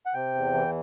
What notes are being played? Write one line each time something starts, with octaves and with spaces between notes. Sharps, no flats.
F#5
C3 G5
E2
E3